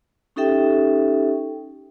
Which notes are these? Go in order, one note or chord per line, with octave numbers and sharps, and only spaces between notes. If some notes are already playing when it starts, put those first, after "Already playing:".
C#4 D#4 G4 A4 E5 G5